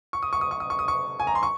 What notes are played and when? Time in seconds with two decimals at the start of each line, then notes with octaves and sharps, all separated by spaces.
0.13 C#6
0.22 D#6
0.33 C#6
0.41 D#6
0.51 C#6
0.60 D#6
0.70 C#6
0.79 D#6
0.88 C#6
1.20 G#5
1.27 A#5
1.35 C6
1.43 C#6